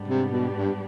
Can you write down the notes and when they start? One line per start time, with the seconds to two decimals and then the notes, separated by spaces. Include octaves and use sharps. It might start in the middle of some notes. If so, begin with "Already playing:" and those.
Already playing: G#2 G3 B3 D4 G4
0.08 C3
0.31 B2
0.54 G2